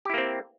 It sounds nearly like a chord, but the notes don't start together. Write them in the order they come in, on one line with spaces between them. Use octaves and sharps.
G4 E4 A#3 C4